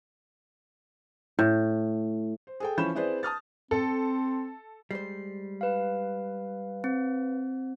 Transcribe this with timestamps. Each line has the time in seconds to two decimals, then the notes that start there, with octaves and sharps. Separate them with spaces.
1.39 A2
2.47 C5
2.60 G#4 A4 G5
2.78 E3 F3 C#4 B5 G6 E7
2.95 C4 E4 G#4 B4 C5 D5
3.23 A5 D#6 F6 A6
3.71 C4 A4
4.91 G3 G#3 C5 C7
5.61 B4 F5
6.84 C4